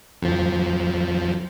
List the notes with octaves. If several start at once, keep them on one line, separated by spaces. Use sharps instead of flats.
F2 F3